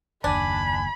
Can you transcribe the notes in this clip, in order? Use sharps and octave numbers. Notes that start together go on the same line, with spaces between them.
F#1 D#2 D4 G#5 B5